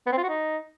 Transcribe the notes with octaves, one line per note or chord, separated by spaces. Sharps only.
B3
C4
F4
F#4
D#4